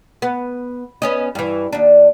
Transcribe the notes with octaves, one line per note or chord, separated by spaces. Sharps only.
B3
B3 C#4 D#5
G2 E3
D#2 D4